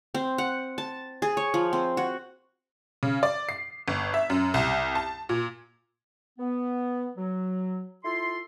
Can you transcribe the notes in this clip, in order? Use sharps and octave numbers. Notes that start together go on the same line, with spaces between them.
C4
F#5
A5
G#4
C#5
F3
C4
F#4
C#3
D5
C7
G1
E5
F#2
C2
A5
A#2
B3
F#3
E4 F4 A4 C6